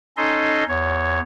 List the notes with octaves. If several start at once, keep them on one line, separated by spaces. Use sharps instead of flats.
C#4 D#4 A4 D#5 C6
E2 C#5